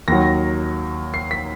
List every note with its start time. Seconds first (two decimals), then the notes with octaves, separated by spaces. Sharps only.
0.08 D#2 D#3 F#3 A#6
1.14 C7
1.31 B6